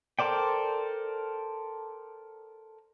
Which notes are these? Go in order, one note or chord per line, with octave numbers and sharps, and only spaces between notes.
A4 A#4 C5 D5 G5